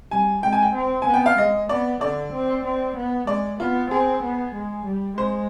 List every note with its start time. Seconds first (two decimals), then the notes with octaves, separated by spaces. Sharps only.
0.11 G3 G#5
0.43 G#3 G5
0.53 G#5
0.63 G5
0.74 C4
1.02 B3 G#5
1.14 G5
1.26 F5
1.38 G#3 D#5
1.69 B3 D5
2.01 D3 D5
2.33 C4
2.65 C4
2.96 B3
3.27 G#3 D5
3.60 B3 F4
3.90 C4 G#4
4.22 B3
4.55 G#3
4.85 G3
5.17 G#3 C5